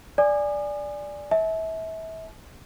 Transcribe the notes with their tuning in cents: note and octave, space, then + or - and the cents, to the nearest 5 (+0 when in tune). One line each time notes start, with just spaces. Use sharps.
D5 +0 G#5 -10 D#6 -45
E5 -30 A5 -45